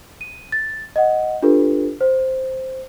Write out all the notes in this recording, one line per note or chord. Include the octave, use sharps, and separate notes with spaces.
D#7
A6
D#5 F#5
D4 F4 G4 A4 B4
C5